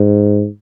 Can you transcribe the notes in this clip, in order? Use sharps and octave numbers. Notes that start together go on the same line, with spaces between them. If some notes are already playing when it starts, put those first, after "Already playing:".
Already playing: G#2